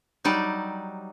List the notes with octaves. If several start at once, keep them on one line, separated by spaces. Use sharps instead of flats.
F#3 G3 D#4 D5